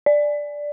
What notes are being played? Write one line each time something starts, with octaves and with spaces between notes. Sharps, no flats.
D5